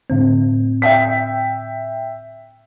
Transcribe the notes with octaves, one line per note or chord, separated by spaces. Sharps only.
A2 D3 C4
E5 G5 B6